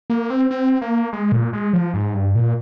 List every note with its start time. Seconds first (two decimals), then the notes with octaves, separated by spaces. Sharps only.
0.10 A#3
0.30 C4
0.51 C4
0.81 A#3
1.13 G#3
1.32 A#2
1.53 G#3
1.73 F3
1.94 G#2
2.14 G2
2.35 A#2